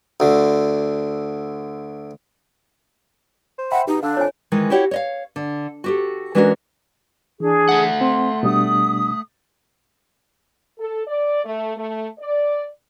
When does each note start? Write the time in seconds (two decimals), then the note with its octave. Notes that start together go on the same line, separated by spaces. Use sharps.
0.20 D2 D3
3.58 C5
3.72 E5 F#5 G5 B5
3.87 B2 D#4 G4
4.03 D3 D4 F5 E6
4.17 F2 C#5 G#5
4.52 D#3 E3 G#3
4.70 E4 F#4 G4 C#5 D#5 F#5
4.91 C#5 D#5 F5
5.36 D3
5.84 F#4 G4 A4
6.35 E3 G#3 C#4 D4 F#4 A#4
7.40 E3 D4 G#4
7.69 A3 F#5
8.01 C4 C6
8.43 B2 G3 D4 D#6
10.78 A4
11.07 D5
11.45 A3
11.77 A3
12.19 D5